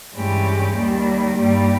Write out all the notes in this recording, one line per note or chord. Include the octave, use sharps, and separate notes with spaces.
G2 E3 G#3 C#4 G4
D#2 D#3 G3
G2 G3 A#3 D#4 G4